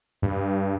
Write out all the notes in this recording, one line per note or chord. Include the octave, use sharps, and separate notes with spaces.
G2